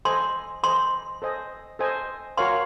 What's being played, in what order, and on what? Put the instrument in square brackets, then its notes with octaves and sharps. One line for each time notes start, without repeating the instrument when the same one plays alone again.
[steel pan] A4 C5 D#5 G#5 [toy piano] C6
[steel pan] A4 C5 D#5 G#5 [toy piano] C6
[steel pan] A4 C5 D#5 G#5
A4 C5 D#5 G#5
[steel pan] F#4 A#4 C#5 F5 G#5 [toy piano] C6